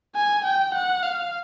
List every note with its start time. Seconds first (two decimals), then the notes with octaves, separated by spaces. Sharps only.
0.16 G#5
0.45 G5
0.75 F#5
1.03 F5